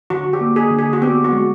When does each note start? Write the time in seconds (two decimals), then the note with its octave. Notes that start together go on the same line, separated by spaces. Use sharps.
0.10 D3 F#4
0.33 G4
0.41 A#3
0.56 G#4
0.71 D3
0.79 G#4
0.93 F#4
1.02 B3 G4
1.24 F#4
1.32 G#3